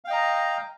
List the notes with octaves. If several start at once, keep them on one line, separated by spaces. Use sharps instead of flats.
D#5 F5 G5 A#5